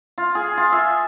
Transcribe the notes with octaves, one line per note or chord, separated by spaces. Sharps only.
F4
G#4
F4
E5